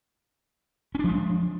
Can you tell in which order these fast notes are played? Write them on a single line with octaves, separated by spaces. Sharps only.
C#4 D4 F3 G#3